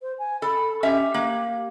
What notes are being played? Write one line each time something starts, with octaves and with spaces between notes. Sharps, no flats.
C5
G#5
A4 B5
C#4 G4 E5
A#3